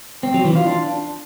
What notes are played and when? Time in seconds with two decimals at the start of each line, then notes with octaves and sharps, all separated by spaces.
0.23 C4
0.34 F#3
0.45 E3
0.56 F4
0.66 D4